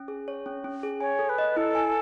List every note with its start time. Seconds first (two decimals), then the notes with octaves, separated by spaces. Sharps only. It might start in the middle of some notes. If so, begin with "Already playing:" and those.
Already playing: C#4
0.08 G#4
0.28 C#5
0.46 C#4
0.64 C#4
0.83 G#4
1.01 C#5 G#5
1.19 A4
1.29 B4
1.38 D#5
1.56 E4 A4
1.75 G#5